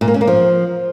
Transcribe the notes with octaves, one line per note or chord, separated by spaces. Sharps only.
A#2
A#3
C#4
A#3
F3